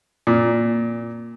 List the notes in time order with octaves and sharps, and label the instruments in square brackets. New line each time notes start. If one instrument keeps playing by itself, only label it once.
[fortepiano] A#2